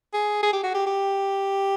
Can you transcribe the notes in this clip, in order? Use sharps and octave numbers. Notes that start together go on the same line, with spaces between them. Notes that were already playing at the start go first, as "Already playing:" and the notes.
G#4
G#4
G4
F#4
G4
G4